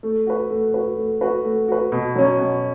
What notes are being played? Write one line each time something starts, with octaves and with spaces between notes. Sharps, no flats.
A3
F#4 B4
A3
F#4 B4
A3
F#4 B4
A3
F#4 B4
B2
F#3 C#4
B2